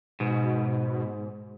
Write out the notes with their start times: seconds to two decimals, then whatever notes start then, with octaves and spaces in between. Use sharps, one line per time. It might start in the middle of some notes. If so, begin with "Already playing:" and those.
0.20 G#2 B2